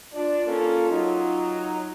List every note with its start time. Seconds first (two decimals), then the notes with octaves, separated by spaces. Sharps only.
0.13 D4 F4 D5
0.47 A#3 C#4 A4
0.91 F#3 D#4